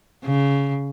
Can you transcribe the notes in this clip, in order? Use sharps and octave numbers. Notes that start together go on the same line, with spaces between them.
C#3